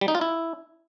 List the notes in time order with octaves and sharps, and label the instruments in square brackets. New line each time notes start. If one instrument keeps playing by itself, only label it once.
[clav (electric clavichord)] G3
D#4
F4
E4